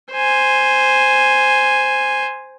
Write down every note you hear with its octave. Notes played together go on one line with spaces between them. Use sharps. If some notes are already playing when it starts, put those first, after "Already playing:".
C5 G#5